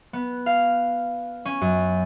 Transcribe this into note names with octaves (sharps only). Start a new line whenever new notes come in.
B3
F5
C#4
F#2